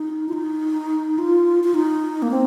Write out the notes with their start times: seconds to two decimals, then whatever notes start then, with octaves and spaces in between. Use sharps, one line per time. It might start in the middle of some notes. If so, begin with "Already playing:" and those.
Already playing: D#4
0.29 F4
0.33 D#4
1.18 F4
1.64 F4
1.74 D#4
2.22 A#3
2.31 C4